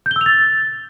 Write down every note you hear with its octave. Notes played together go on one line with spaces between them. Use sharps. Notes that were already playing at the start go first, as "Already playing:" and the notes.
G6
G7
E6
F7
A6